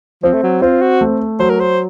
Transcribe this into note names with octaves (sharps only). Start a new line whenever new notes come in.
F3 C4
A3
F#3
C4 F4
F#4
A3
F#3 C5
A#4
C5